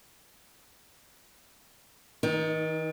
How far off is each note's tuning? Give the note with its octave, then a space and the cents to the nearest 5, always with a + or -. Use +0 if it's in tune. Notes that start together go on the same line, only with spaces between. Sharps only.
D#3 +45 D#4 +0